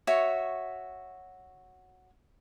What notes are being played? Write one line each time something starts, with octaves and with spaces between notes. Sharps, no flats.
F#4 C#5 E5